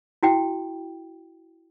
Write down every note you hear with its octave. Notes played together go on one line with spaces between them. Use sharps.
E4 F#4 G5